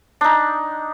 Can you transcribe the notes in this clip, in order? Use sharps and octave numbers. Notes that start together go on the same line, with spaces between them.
D4 D#4